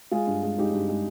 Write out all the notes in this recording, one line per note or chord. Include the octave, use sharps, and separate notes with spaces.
G#3 F4 G#4
G2
G#3
G#3 D#4 G4
G2
G#3